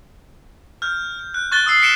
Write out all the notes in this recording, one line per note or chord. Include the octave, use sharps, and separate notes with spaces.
F6 G6
F6
F#6
C#6 F#6 A6 G7
D#6 E6 C7
B6 C#7 D7 E7 G7